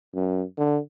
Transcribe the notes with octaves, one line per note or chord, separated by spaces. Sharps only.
F#2
D3